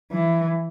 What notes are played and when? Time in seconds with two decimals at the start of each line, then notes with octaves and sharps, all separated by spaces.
0.12 E3